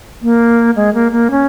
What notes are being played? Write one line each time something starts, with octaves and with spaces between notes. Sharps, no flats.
A#3
G#3
A#3
A#3
C#4